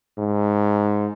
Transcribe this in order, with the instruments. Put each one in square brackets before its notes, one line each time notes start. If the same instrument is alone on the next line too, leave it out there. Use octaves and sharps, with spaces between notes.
[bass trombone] G#2